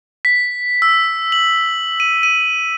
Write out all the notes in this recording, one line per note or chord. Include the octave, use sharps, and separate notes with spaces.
B6
E6
F#7
D#7
D#7